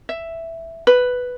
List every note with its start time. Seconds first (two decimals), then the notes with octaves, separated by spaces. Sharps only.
0.09 E5
0.87 B4